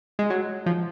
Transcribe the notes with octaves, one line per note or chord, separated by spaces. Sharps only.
G#3
F#3
F3